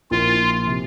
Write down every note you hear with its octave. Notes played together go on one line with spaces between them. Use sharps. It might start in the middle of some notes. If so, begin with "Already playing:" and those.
A#1 A#2 F3 A#3 E4 F4
C3